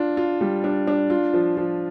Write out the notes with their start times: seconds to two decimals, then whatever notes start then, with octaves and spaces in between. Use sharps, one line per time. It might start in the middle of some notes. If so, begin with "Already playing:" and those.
Already playing: D4 F4
0.17 F4
0.41 G3
0.64 D4
0.87 D4
1.10 F4
1.34 F3
1.57 F3